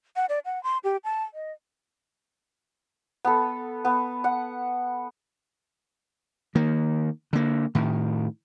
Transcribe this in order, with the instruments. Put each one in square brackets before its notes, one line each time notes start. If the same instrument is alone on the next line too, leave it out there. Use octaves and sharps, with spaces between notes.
[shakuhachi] F#5
D5
F#5
C6
G4
A5
D#5
[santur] B3 A4
B3
F#5
[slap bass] D#3 A#3
D3 A#3
A2 D#3